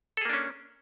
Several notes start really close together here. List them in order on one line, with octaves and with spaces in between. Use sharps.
A4 G#4 A#3 D4 C#4